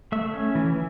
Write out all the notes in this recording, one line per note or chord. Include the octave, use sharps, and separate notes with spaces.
A3 E5
C#4
E3